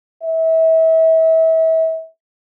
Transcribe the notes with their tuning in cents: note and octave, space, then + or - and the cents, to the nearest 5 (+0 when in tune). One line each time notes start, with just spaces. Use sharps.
E5 -30